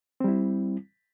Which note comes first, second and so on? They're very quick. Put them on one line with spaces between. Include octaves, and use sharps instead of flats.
C4 G3 E4